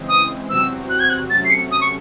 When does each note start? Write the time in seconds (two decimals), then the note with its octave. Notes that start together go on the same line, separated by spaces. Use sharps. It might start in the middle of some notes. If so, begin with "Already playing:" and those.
Already playing: C#3 E3 G#3 C4
0.09 D#6
0.49 E2 C3 F#3 C4 F#4 E6
0.90 F#6
1.00 G#6
1.09 F#6
1.30 C3 F#3 A3 C#4 A6
1.45 C7
1.51 C#7
1.71 D#6
1.81 C#6